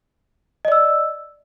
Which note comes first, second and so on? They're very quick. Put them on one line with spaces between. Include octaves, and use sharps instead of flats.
D#5 D5 E6